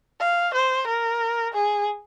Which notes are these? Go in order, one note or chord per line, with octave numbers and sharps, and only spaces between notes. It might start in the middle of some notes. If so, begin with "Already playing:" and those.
F5
C5
A#4
G#4